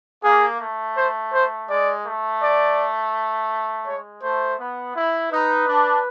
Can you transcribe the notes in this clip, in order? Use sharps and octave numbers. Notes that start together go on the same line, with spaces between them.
A#3 G#4
A3
C5
C5
G#3 D5
A3
D5
G#3 C#5
A3 C5
B3
E4
D#4 B4
D4